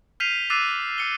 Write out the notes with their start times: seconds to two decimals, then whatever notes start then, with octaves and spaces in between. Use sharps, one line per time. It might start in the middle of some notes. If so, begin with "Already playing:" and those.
0.20 F6 G6 B6 C7 D#7 F7
0.50 D6 E6 F#6 A6 C7 D#7
0.98 E6 C#7 G7